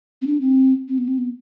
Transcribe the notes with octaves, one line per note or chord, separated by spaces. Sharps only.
C4
D4
C4
C4
B3
C4
B3